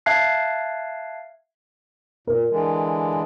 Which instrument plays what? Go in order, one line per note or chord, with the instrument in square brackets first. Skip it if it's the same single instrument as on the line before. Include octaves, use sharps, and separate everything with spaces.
[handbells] E5 F5 A5 F#6 G#6 C7
[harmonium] A#2 [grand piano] A#4
[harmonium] D3 E3 G#3